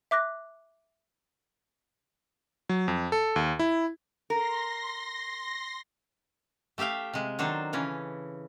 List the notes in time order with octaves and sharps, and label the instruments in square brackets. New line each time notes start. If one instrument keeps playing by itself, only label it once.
[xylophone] E5 D6 F#6 A#6
[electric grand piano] F#3
F2
A4
D#2
E4
[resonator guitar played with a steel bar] A#4 [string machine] C6 A#6
[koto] A3 G4 E5 F5 G5
C3 G#3
D#3 F#3 D4 A4 C5
C#3 E3 C#4